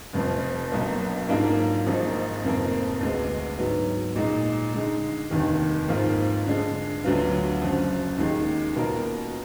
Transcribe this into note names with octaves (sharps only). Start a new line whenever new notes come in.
F1 F2 F3
B1 B2 F#3 A#3 D4
G#2 F#3 A#3 D4 F4
G#1 G#2 F3 A#3 D#4
F1 F2 F3 A#3
D2 D3 G#3 B3
G#2 F#3 B3
A#2 G#3 D#4
D3 G#3 D#4
F1 D#2 D#3
G#2 F3 A#3 F4
D3 G#3 D4
D2 D3 F#3 B3 F4
F#1 F#2 F3
D#2 D#3 G#3
B2 A#3 F4 A#4